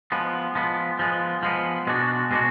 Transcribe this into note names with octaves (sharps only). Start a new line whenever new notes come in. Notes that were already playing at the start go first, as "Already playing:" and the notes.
F3 G#3 B3
F3 G#3 B3
F3 G#3 B3
F3 G#3 B3
B2 G#3 D4 F#4
B2 G#3 D4 F#4